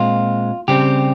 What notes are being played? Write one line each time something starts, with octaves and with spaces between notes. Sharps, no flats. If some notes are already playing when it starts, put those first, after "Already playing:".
Already playing: A#2 G#3 C4 F4
C#3 G3 C4 G4